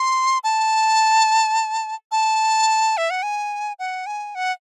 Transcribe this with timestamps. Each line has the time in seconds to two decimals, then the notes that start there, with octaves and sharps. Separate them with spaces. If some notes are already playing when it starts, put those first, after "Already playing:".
Already playing: C6
0.44 A5
2.12 A5
2.97 E5
3.10 F#5
3.23 G#5
3.79 F#5
4.06 G#5
4.35 F#5